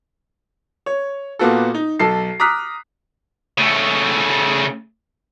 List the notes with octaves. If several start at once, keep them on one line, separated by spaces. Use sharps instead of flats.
C#5
A#2 A#3 B3 F#4 A4
D#4
B1 A4 A5 C7
A#5 D6 D#6 F6 F#6 B6
C#3 A3